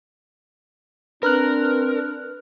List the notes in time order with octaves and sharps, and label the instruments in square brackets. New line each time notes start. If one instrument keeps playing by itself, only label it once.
[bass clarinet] C4 [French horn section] D4 [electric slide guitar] A#4 [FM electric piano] B4 F6 F#6